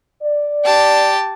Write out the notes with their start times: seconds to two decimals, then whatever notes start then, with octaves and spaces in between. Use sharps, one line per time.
0.22 D5
0.65 G4 A5